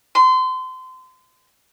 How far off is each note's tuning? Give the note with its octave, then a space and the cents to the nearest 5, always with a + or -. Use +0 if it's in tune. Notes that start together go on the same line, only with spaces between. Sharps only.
C6 -30